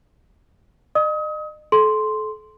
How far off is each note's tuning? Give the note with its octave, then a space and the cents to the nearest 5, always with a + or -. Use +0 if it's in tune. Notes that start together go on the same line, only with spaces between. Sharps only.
D#5 -35 D#6 +35
A4 -35 C6 +0